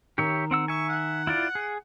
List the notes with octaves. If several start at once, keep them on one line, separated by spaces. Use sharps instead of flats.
D#3 G4 C#5 E5
C4 F#5 E6
E5 G#5 C#6
F#5
E4 F4 D5
G#4